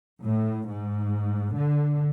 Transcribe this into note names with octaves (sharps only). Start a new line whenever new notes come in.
A2
G#2
D3